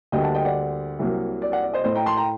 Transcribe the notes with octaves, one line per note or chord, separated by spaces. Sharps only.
D2 D3 G3 A#3 D#5 G5
F#5 A5
D#5 G5
D5 F#5
C2 C3 F#3 A#3
D5
D5 F#5
D5
C5 D#5
A2 A3 C5 D#5
G5 A#5
A5 C6
G5 A#5